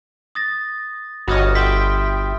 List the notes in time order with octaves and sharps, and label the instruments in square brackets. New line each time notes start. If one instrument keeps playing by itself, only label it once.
[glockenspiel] D#6 A6 A#6
[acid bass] G1 [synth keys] F#4 C#5 D#5 [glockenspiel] B5 D#6 F6
[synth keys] E5 G5 [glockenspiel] C6 D#6 B6